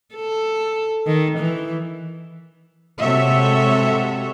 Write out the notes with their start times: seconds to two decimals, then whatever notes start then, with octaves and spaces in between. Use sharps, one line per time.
0.15 A4
1.07 D#3
1.38 E3
3.00 C3 G#3 F#4 A4 C#5 E5